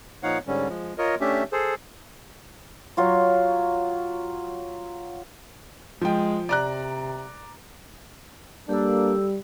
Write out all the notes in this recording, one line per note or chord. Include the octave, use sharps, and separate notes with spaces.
A#2 F3 D#4 C#5 F5 F#5
G#2 D3 G3 C#4
F3 G#3
F4 A#4 C#5 D#5
A3 C#4 D4 G4 E5
G#4 A4 C5
F#3 F4 C#5
F3 G#3 G5
C3 D5 A#5 F#6
G3 A#3 D4 G4 A4 E6